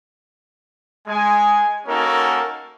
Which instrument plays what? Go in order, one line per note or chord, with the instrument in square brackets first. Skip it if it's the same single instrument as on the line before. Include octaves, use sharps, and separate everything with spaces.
[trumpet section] G#3 G#5
A#3 C#4 D#4 F#4 A4 A#4